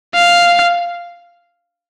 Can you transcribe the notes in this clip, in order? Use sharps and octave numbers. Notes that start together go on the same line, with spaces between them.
F5